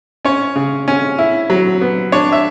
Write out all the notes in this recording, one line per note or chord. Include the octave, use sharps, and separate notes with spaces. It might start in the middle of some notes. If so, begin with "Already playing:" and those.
C#4 C#5
C#3
C#4
E4
F#3
B3
D4 C#5
E5